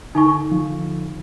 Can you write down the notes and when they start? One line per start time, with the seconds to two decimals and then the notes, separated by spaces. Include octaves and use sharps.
0.15 D3 D#4 G#5 C#6
0.52 F3